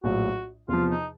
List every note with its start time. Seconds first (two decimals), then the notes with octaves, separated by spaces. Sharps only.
0.03 A#1 A2 F#3 F#4
0.68 E2 C3 F3 F4
0.91 D#4